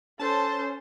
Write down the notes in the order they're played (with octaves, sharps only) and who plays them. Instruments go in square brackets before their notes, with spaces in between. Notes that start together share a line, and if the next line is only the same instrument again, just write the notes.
[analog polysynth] C#4 [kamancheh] A4 C5 [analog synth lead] A5